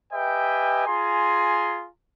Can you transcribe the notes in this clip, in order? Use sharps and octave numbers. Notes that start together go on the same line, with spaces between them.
G4 B4 D#5 E5 G5 G#5
F4 G#4 G#5 A#5 C6